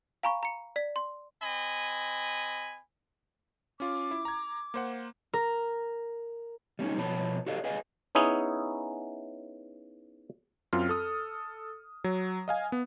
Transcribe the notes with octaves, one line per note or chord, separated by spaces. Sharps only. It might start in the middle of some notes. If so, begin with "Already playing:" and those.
F5 G#5 A#5 B5 C#6
A#5 C#7
D5 B6
C6
C4 D#5 G#5 B5
C#4 F4 D6
E4
A#5 G#6
A#3 C5 F#5
A#4
G3 A3 C#4 D#4
B2 F3 B3 C#5 A5 B5
F#4 G4 A4 D5 D#5 F5
G#4 B4 D#5 F5 G#5
B3 C#4 D#4 E4 G#4
F#2 C4 F4 F6
A4 D#6
F#3
D#5 F5 G#5
B3